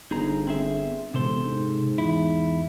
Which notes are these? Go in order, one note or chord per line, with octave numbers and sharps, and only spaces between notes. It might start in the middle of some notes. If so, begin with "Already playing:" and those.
G1 D#4 G#4 A#5
C4 G#4 E5
E1 C3 A4 C5
G#2
E2 E4